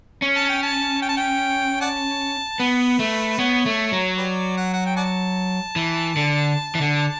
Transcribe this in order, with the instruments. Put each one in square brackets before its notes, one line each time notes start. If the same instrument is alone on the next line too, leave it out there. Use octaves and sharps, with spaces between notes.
[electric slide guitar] C#4
[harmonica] A5
G5
A5
G5
A5
G5
D5 F#5 A5
[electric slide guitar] B3 [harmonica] B4
[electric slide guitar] A3
[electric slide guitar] B3 [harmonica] C#5
[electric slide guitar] A3
F#3
[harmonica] G4 B4 D5
F#5
F#5
G5
D5 F#5 A5
[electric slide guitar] E3
D3
E3
D3